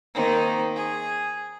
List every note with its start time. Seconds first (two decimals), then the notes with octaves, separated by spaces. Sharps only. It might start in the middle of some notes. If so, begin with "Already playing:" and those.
0.15 D#3 A#3 C4 D#4
0.75 G#4